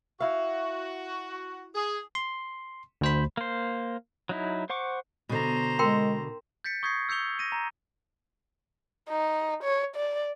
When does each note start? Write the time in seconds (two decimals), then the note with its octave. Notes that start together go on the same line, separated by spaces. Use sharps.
0.20 E4 F#4 F5
1.75 G#4
2.15 C6
3.01 D2 C5 B5
3.37 A#3 C5
4.29 F#3 D#4 E4
4.70 C5 F#5 C#6 D6
5.29 B2 D3 C5 A#5
5.79 G#3 A#4 G5 C6
6.64 G6 A6 B6 C#7
6.83 C#6 D#6 G6 G#6 A#6 C7
7.09 E6 G6 C#7 F7 G7
7.39 A#6 D#7
7.52 A#5
9.09 D#4
9.63 C#5
9.96 D5